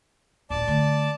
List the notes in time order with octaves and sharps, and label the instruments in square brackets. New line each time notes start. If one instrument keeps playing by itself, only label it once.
[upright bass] D1 A#1 [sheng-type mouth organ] D5 A5
[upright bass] D3 A3